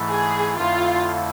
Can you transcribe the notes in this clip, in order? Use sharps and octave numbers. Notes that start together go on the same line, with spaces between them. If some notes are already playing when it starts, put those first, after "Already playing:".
Already playing: G#2 E3 A3 E4
G#4
F2 D3 A3 E4 F4